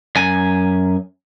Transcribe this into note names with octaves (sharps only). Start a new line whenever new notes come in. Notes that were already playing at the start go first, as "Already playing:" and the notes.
F#2 G#5